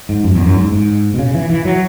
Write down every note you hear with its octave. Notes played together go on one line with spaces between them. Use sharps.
G#2
F#2
E2
F#2
G#2
G#2
B2
C#3
E3
E3
F#3